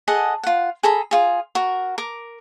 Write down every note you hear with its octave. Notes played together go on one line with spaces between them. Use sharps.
G#4 A4 D#5 F#5
F4 F#5
G#4 A4 A#5 B5
F4 G#4
F#4 A#4
A#4 D6